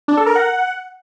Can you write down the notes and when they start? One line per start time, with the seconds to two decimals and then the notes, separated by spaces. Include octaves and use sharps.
0.08 D4
0.17 A4
0.26 A#4
0.35 F#5